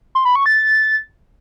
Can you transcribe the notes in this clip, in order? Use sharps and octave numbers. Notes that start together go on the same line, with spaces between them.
C6
B5
C#6
A6